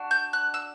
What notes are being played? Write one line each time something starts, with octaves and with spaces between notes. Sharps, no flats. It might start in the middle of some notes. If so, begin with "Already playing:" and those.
Already playing: D4 F#4
G6
F#6
E6